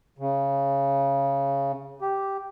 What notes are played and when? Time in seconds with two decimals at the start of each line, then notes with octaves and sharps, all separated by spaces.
0.18 C#3
2.01 G4